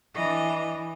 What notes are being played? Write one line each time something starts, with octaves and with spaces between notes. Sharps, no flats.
E3 D4 D#5